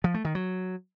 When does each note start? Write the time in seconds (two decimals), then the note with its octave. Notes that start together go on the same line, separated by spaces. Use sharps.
0.04 F3
0.14 A3
0.25 D#3
0.35 F#3